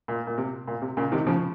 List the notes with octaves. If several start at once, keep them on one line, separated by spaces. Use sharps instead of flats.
A#2
A#2
C3
A#2
C3
A#2 C#3
C3 D#3
C#3 F3